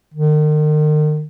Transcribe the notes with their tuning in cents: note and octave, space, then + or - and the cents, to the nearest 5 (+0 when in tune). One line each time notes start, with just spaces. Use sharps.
D#3 -40